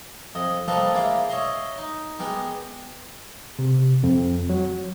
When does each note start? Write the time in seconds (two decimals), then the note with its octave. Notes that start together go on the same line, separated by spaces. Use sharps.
0.35 F2 D#5 D#6
0.68 F3 G3 A#3 A4 B4 D#5
0.94 G#3 A#3 E4 D5 F5
1.30 C#5 D#5 E5 A#5 C6
1.78 D#4
2.19 G#3 B3 G4 A#4
3.59 C3
4.03 F2
4.49 F#3